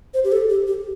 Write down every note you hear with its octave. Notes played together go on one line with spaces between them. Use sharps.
C5
G4
A4
G4
G4